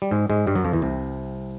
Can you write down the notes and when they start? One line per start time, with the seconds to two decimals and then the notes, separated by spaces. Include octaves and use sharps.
0.02 G3
0.11 G#2 G#3
0.30 G#2 G#3
0.47 G2 G3
0.55 F#2 F#3
0.64 F2 F3
0.73 E2 E3
0.82 C2 C3